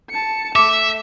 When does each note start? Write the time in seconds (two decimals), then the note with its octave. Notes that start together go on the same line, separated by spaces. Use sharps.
0.11 A5 C#7
0.56 A3 E5 D6